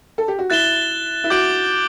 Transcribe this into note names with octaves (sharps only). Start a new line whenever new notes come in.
A4
G4
F#4
E4 F#6 A6 E7 G7
E4
F#4 D6 G6 D7 F#7